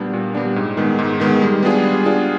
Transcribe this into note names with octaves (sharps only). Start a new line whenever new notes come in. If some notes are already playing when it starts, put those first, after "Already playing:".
Already playing: A#2 G3 B3 D4
A#2
G3 B3 D4
G#2
D#3 G#3 B3
G#2
D#3 G#3 B3
G3
B3 D4 F4 G#4
G3
B3 D4 F4 G#4